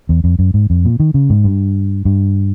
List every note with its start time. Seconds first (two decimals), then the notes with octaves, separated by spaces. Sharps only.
0.09 E2
0.24 F2
0.39 F#2
0.54 G#2
0.70 F2
0.85 A#2
1.00 D#3
1.14 C#3
1.30 G#2
1.44 G2
2.05 G2